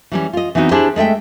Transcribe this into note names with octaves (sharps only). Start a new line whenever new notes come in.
E3 G3 C#4
F4 D#5
E3 B3 C4 D#4 F#4
D4 E4 G4 G#4 C5
G#3 A3 E5 G5